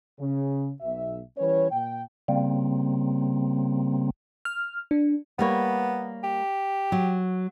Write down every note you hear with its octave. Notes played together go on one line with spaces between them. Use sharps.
C#3
B1 B2 E5
E3 G3 C#4 B4 C#5
A#2 G5
C#3 G3 A#3 C4
F6
D4
G3 A#3 B3 C#5
G4
F#3